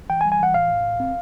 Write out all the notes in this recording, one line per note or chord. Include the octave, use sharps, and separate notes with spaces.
E3 G5
G#5
G3
G#5
E3 F#5
A2 F5
A2
A2
C4